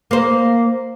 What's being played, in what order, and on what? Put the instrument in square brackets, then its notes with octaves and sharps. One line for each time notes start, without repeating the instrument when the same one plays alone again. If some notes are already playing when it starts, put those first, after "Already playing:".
[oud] A#3 C5